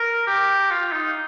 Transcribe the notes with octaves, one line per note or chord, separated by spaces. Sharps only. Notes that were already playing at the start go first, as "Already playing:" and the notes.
Already playing: A#4
G4
F4
D#4